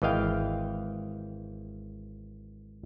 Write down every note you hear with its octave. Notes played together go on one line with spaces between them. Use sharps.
G#1 E3 D#5 F5 G5